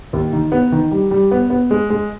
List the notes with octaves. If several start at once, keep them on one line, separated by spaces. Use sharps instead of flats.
D#2
D#3
B3
D#3
G3
G3
B3
B3
G#3
G#3